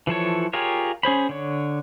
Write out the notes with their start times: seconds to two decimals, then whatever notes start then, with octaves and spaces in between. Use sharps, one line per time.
0.07 E3 F3 A4 C#5
0.53 F4 G4 G#4 A#4 C#5
1.03 C#4 G#4 C5 B5
1.29 D3 C#5